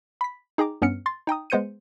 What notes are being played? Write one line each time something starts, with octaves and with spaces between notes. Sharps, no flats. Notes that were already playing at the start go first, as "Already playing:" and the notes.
B5 B6
D#4 G#4 G5 A#5 D6
G2 B3 C#4 F6 C#7
C6 A6
D#4 G5 A#5 D#6
G#3 B3 C5 G6 C#7 D#7